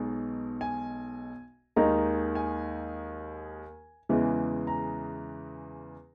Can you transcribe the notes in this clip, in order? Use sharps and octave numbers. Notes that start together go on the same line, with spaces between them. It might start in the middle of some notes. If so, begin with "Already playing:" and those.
Already playing: B1 B2 G#3 D#4
G#5
D#2 D#3 G#3 D#4 A#5
G#5
E2 C#3 E3 G#3
A#5